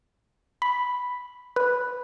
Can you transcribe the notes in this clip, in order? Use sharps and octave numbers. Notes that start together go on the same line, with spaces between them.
B5
B4